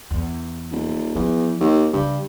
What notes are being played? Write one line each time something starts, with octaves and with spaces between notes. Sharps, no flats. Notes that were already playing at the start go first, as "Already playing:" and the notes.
E2
D#1
E2 F3
D#2
G2 C#3 F#3